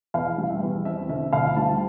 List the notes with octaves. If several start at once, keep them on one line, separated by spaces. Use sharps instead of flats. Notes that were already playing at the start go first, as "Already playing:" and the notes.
E2 F5
G3
E5
E2
C4 E5
D3 E5
D2 F5
G3 A5